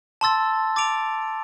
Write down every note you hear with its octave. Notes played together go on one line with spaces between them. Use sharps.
A5 C6 E6 A6
D6 A6 D7 F7